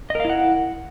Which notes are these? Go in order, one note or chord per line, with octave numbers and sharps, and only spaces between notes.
E4 A#4 D#5 F5 F#5